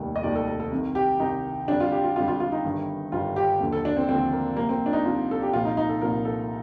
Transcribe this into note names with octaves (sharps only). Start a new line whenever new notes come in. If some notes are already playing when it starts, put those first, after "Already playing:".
Already playing: F1 D#2 D#3 G3
D#5
F1 D#2 D#3 G3 D5
A4
A4
A4
C2 C3 D#3
G4
C2 C3 D#3 D#4
F2 D3 G3 D4
F4
G4
F4
F2 D3 G3 F4
F4
F4
D#4
G1 G2 D#3 G3
G1 G2 D#3 G3 F4
G4
D#2 D3 F3
A4
D4
C4
D#2 D3 F3 C4
A#3
C2 C3 F3 A#3
C4
D4
D#4
C2 C3 F3 F4
A4
G4
C2 A#2 F3 F4
D#4
D#4
A4
C2 A#2 F3 A#4
A4